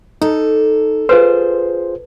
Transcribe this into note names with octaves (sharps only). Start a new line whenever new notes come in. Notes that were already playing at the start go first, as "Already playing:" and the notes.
D#4 A4
F4 G#4 B4 C5